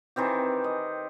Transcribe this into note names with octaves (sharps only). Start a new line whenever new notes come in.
D#3 E3 C4 G4
D#5